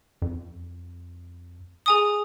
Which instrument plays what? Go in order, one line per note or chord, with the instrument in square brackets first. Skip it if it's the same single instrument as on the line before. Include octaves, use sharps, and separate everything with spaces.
[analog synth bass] F2
[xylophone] G#4 G#5 D#6